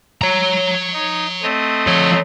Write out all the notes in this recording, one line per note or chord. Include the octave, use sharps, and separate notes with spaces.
C#5 A#5
D#4
A3 C4 D#5
F3 C#5